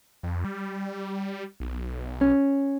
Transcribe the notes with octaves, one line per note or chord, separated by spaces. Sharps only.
F2
G3
B1
C#4